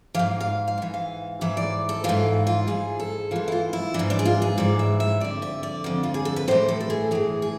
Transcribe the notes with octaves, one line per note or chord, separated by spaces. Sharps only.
G#2 E3 F5
F5
F5
G#2 E3
F5
G#2 E3 E5
D5
A4
G#2 E3 F4
F4
G#2 E3 G#4
A4
G#2 E3 F4
E4
F4
E4
G#2 E3 D4
D4
G#4
F4
G#4
G#2 E3 D5
E5
E5
F2 D3 D5
E5
D5
F2 D3
F4
G#4
A4
B4
A2 E3 C5
A4
A4
G#4
A2 E3 G#4
G#4